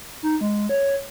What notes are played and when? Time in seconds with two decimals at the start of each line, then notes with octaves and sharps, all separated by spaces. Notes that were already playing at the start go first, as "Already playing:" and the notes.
0.23 D#4
0.41 G#3
0.69 C#5